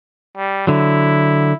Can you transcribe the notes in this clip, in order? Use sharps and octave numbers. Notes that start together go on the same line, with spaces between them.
G3
D3 F#3 E4